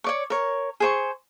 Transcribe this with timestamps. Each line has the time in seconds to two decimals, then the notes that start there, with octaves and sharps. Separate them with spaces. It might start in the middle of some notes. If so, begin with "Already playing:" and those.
0.04 C#5 D5 C#6
0.30 A#4 C#5
0.80 G#4 C5 C#6